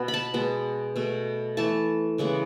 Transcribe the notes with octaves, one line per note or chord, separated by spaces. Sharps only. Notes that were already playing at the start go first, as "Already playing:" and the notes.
Already playing: B2 B3
B5
A5
B2 G#3 B3
B2 A3
E3 A3 A5
C#3 E3 G#3 B3